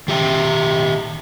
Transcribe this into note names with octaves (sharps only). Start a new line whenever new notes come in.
D#3 G4 E5 G5